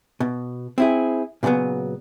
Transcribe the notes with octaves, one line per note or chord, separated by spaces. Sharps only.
B2
C4 E4 G#4
A#2 C#3 F3 F#3 B3